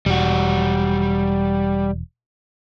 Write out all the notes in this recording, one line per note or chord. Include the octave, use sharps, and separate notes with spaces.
E1 G3 F#4